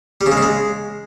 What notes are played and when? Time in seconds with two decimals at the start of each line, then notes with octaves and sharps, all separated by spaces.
0.21 G3
0.26 C#3
0.32 G#3
0.37 C#3
0.43 G#3